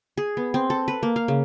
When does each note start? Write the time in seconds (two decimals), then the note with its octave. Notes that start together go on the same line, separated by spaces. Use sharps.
0.17 G#4
0.37 B3
0.54 C4
0.70 A4
0.88 B4
1.03 A#3
1.16 F5
1.28 C#3